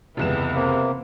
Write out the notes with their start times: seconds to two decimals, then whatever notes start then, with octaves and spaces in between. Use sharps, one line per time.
0.17 F1 C#2 E3 B3 E4 E7
0.55 C3 A#3